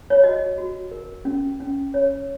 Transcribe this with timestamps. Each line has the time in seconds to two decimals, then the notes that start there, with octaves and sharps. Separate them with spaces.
0.10 C#5
0.23 F#4 D#5
0.58 F#4
0.92 A#4
1.25 C#4
1.60 C#4
1.94 C#5